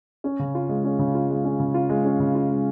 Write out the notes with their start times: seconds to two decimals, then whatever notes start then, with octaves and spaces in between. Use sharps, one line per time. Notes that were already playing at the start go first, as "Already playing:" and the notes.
0.24 C#4
0.39 C#3
0.55 F4
0.69 G#3
0.84 C#4
0.99 C#3
1.14 F4
1.30 G#3
1.45 C#4
1.59 C#3
1.74 F4
1.89 G#3
2.05 C#4
2.20 C#3
2.35 F4
2.49 G#3